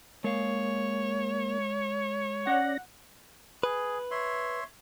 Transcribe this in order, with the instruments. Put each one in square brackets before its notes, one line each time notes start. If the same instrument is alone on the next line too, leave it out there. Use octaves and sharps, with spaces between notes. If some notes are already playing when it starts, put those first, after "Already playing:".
[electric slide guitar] G#3 F5 [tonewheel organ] A#3 [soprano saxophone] C#5
[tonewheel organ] C#4 D5 A#6 [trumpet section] F#5
[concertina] G#4 [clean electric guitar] B4
[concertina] C#5 E5 C6